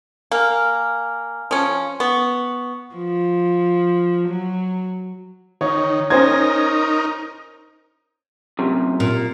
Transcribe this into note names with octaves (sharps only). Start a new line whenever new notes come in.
A#3 F5 G#5 F6
F3 C#4
B3 C#6
F3
F#3
D#3 C#5
C#4 D#4 A#4 C5 G#6
F#2 C3
A#2